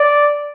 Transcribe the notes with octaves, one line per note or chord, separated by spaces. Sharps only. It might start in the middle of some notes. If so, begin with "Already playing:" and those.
Already playing: D5